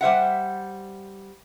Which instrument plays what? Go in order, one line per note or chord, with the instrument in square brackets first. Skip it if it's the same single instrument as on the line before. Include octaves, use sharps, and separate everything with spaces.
[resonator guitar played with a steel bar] G3 C5 E5 F#5